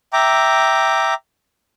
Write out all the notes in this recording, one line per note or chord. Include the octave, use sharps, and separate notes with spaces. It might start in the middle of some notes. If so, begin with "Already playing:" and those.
E5 G5 A#5 D6